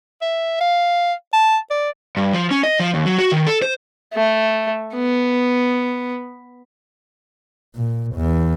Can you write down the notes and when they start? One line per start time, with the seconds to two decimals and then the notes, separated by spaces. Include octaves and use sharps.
0.21 E5
0.61 F5
1.33 A5
1.70 D5
2.17 G2
2.33 F3
2.51 C#4
2.63 D#5
2.80 F3
2.94 D#2
3.06 F#3
3.18 F#4
3.32 D#3
3.47 A4
3.62 C5
4.14 A3
4.95 B3
7.76 A#2
8.16 E2